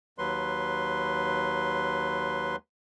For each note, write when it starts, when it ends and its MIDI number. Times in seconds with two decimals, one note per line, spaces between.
0.18 2.56 39
0.18 2.56 54
0.18 2.56 71
0.18 2.56 84